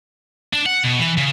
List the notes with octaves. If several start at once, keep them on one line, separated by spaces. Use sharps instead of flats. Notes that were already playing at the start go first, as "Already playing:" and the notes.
D4
F#5
B2
E3
C#3